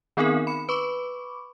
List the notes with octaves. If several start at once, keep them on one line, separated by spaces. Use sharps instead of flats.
D#3 B3 C4 D#4 G#4 A#4
B5 C#7
B4 B5 C#6 D6